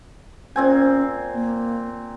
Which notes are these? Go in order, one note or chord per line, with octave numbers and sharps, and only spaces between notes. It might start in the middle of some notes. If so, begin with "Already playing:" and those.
A#2 C4 C#4 G#5
A#3